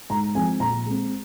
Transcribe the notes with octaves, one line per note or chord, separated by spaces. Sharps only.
G#2 A#5
F3 G#3 C4 G#5
A#2 A#5
G#3 C4